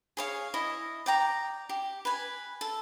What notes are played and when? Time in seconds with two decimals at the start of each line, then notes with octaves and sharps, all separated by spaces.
0.17 G#4 C#5 F5
0.54 E4 D#5
1.06 D5 G5 A#5
1.69 G4
2.05 B4 G#5
2.61 A4